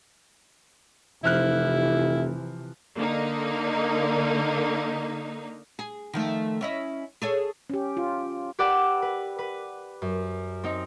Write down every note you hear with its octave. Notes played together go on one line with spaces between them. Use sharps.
F1 C3 E3 F3 E4 F6 F#6
D3 A#3 D#4
G#4
D#3 F3 A3
C#4 E4 D#5
G#4 A4 C#5
C#4 G4
F4
G4 B4 D5 F#5 D6 E6
B4
B4
F#2
C4 D#4